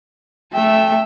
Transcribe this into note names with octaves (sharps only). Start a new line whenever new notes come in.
A3 E5 G5